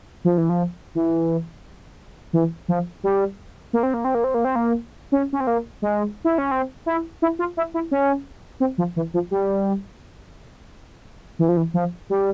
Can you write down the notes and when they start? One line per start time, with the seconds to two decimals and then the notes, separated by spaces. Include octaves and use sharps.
0.25 F3
0.38 E3
0.49 F3
0.95 E3
2.33 E3
2.68 F3
3.03 G3
3.73 A#3
3.83 C4
3.94 A#3
4.04 C4
4.15 A#3
4.24 C4
4.34 A#3
4.45 C4
4.55 A#3
5.12 C#4
5.33 C#4
5.40 C4
5.47 A#3
5.82 G#3
6.25 E4
6.38 C#4
6.51 C4
6.86 E4
7.22 E4
7.39 F4
7.57 E4
7.74 E4
7.91 C#4
8.60 C4
8.78 F3
8.96 E3
9.14 F3
9.31 G3
11.39 E3
11.49 F3
11.57 E3
11.74 F3
12.10 G3